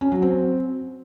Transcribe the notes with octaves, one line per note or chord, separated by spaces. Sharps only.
C#4
F#3
C4